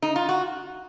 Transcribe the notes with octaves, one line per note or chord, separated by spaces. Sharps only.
D#4
F4
F#4